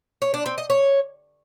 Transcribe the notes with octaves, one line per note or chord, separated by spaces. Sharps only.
C#5
D4
C4
D#5
C#5